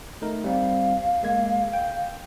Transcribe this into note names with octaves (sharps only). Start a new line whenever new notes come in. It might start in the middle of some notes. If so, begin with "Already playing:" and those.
A3 D#4 A#4
G3 C4 F5
G#3 A#3 G#6
G5